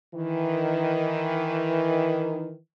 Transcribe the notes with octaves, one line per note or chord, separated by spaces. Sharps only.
D#3 E3